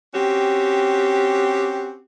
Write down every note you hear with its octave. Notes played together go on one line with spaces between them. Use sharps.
C4 C#4 F#4 G4